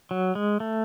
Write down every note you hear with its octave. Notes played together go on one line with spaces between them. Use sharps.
F#3
G#3
A3